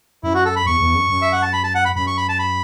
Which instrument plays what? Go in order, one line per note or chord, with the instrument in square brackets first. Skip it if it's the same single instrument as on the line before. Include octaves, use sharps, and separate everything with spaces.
[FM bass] F#2 [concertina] E4
[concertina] F#4
A4
B5
[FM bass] E2 [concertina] C#6
[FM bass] E2
F#2
F#2
[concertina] E5
F#5
A5
B5
A5
F#5
B5
[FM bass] F#2 [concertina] B5
[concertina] C#6
B5
A5
B5